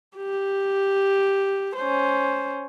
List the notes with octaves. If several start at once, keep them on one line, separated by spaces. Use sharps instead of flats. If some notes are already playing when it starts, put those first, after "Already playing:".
G4
C#4 C5